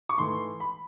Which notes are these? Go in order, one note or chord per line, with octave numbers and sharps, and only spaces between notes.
C#6
G#2 E3 A3 C6
B5